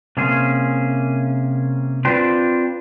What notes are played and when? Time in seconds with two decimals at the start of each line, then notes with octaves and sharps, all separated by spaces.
0.17 C3 A#3 C#4 G#4 C5
2.05 C4 D4 F4 G4 B4 C5